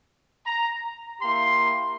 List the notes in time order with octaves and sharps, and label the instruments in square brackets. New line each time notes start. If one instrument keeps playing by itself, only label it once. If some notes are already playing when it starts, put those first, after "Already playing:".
[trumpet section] A#5
A#3 E4 G4 C6